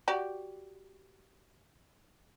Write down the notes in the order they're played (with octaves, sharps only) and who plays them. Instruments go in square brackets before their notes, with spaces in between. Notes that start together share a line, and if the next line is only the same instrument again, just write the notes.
[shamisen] F#4 G4 D5